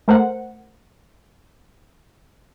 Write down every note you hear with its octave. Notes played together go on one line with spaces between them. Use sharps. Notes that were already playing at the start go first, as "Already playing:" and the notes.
A3 A#4 C5 F#5